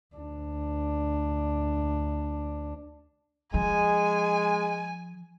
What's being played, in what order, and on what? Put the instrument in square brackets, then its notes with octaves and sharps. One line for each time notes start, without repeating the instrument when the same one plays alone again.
[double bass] D2 D4
[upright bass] F3 [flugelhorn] G#3 [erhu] G#5